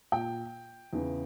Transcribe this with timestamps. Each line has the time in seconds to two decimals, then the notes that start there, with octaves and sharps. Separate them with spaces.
0.12 A#2 G5
0.93 E2 C#3 E3